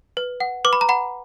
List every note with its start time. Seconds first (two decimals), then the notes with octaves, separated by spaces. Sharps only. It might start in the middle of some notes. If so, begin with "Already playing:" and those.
0.17 B4
0.40 F#5
0.65 B4 D6
0.73 B5
0.81 A#5
0.89 F#5 B5